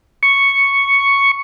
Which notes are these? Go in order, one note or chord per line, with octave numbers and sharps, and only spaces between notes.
C#6